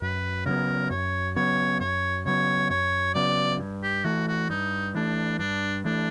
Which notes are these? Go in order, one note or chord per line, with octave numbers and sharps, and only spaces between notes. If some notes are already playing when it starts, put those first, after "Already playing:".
F#2 B4
C#3 F#3 B3 A#4
F#2 C#5
C#3 F#3 B3 C#5
F#2 C#5
C#3 F#3 B3 C#5
F#2 C#5
C#3 F#3 B3 D5
G2
G4
E3 A3 F#4
F#4
G2 D#4
E3 A3 D4
G2 D4
E3 A3 D4